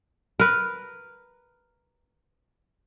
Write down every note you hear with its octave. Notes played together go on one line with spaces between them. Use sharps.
A#4 B4